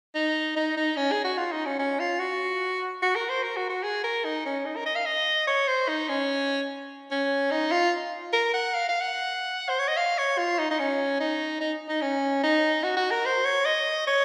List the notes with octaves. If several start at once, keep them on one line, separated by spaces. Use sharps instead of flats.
D#4
D#4
D#4
C#4
G#4
F#4
F4
D#4
C#4
C#4
F4
F#4
F#4
A#4
C5
A#4
F#4
F#4
G#4
A#4
D#4
C#4
D#4
A#4
D#5
F5
D#5
C#5
C5
D#4
C#4
C#4
D#4
F4
A#4
F#5
F5
F5
F#5
C5
C#5
D#5
F5
C#5
F4
D#4
D#4
C#4
D#4
D#4
D#4
C#4
D#4
F#4
F#4
A#4
C5
C#5
D#5
C#5